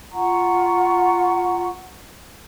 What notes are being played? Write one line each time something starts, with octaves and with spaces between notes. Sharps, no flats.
F4 F#5 A#5 C#6